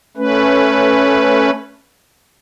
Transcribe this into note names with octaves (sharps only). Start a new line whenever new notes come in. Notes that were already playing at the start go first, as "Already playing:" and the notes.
A3 C#4 B4